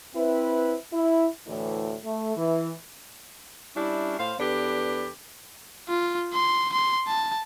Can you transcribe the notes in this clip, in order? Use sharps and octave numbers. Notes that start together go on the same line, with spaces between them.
C4 E4 B4
E4
D2 A2 E3
A3
E3
G3 C#4 D4 E4
A2 C5 F5
E2 D4 G4 A4 B4
F4
C6
C6
A5